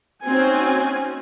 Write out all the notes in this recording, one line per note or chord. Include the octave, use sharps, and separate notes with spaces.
A#3 C4 C#4 D#4 F#4 G#5